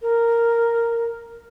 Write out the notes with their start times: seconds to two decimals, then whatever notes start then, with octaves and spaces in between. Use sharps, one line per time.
0.01 A#4